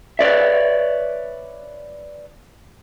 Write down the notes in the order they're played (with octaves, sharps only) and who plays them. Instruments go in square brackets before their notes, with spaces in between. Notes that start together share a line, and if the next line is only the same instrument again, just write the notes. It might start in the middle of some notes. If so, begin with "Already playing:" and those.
[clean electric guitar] B4 C#5 D5 E5